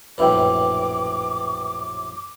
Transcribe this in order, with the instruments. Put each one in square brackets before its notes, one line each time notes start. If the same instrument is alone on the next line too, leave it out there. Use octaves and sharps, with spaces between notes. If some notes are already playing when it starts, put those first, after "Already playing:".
[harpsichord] A#1 F#2 A2 [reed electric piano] B4 E5 G5 [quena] D6